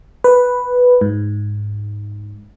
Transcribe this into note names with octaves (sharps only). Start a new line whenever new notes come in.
B4
G#2